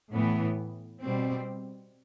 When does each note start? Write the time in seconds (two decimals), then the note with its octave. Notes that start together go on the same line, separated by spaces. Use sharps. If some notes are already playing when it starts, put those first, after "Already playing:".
0.12 A2 E3 B3
1.02 B2 G3 C4